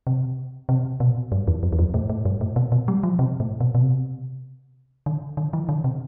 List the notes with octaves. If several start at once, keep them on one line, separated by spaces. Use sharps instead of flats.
C3
C3
B2
G2
E2
F2
E2
F2
A2
A2
G2
A2
B2
B2
G3
F3
C3
A2
B2
B2
C3
D3
D3
E3
D3
C3